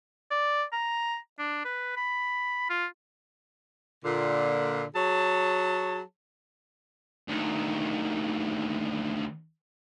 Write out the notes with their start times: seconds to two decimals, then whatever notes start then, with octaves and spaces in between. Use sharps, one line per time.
0.31 D5
0.73 A#5
1.39 D4
1.65 B4
1.97 B5
2.70 F4
4.03 A#2 D3
4.94 F#3 G#4 C#5 A5
7.28 D2 D#3